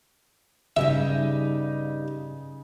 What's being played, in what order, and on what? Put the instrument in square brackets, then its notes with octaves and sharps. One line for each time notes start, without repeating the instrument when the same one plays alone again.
[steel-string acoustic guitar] G2 G3 D#4 [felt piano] C#3 D#5 [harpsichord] E5